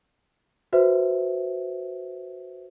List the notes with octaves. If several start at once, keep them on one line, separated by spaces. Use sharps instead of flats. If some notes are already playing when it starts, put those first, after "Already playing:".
F#4 B4 C5 E5